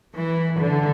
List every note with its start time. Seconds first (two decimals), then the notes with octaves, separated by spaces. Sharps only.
0.16 E3
0.60 D3